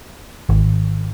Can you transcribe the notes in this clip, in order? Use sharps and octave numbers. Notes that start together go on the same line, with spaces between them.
G#1